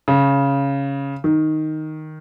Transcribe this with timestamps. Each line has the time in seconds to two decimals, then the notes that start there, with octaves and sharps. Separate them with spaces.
0.08 C#3
1.24 D#3